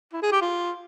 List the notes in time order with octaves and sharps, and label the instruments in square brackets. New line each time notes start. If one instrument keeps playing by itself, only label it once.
[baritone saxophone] E4
G#4
G4
F4